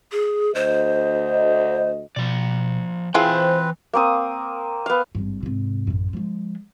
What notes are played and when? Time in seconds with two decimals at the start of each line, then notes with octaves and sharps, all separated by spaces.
0.12 G#4
0.55 D2 C5 D#5
2.16 B2 F3 D5
3.14 E3 C4 E4 F4 G#4 B4 C5 G5
3.93 A#3 C4 D#6
4.86 B3 F5
5.15 G#1 G2
5.43 G#2 C3
5.87 A1 F#2
6.13 F3 G#3